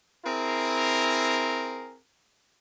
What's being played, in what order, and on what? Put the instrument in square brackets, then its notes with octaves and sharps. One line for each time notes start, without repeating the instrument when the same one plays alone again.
[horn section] C4 E4 G#4 A#4